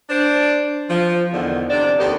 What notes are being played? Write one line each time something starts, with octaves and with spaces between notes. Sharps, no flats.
D4 C5
F3
E2 D3 D#3
C3 D4 D5
D#2 D#3 B3 G4 A4 A#4